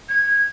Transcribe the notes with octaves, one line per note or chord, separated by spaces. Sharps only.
G#6